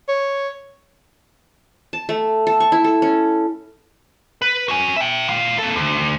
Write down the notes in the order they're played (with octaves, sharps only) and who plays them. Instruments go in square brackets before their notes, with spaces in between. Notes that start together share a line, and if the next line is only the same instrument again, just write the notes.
[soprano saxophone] C#5
[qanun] A5
A3
A4
C#6
E4
A4
C#4
[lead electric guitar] B4
F#4 G#5
E5 G5
A#2 F5
A#3 A4
D2